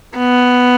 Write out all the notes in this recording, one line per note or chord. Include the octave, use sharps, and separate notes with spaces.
B3